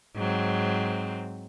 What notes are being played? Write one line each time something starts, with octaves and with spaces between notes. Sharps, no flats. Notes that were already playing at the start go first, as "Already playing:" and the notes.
G#2 F#3 C4